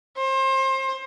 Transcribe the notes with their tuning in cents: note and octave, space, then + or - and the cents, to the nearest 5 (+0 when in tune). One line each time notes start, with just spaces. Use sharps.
C5 +30